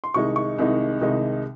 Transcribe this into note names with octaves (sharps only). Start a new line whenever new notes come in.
C6
C2 C3 D#3 G#3 D#4 C#6
C#6
C2 C3 D#3 G#3 D#4
C2 C3 D#3 G#3 D#4